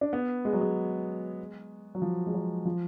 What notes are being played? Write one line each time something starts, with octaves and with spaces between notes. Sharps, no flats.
D4
B3
G#3
F#3
G#3
F#3
F3
G#3
F#3
F3